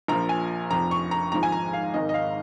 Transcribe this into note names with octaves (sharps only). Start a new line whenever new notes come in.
A#1 A#2 F3 A#5
G#5
F1 F2 F3 A#5
C#6
A#5
G#1 G#2 F3 A#5
G#5
A#5
F5
G#1 G#2 D#3 D#5
D#5
F5